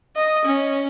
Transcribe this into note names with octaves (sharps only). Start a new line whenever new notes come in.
D#5
C#4